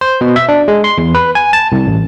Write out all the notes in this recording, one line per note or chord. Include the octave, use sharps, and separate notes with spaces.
C5
B2
E5
D4
G#3
C6
E2
B4
G#5
A5
C2
A1